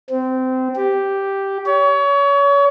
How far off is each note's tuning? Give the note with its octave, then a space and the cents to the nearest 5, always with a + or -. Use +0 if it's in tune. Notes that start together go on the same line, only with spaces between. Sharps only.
C4 -20
G4 +0
C#5 +30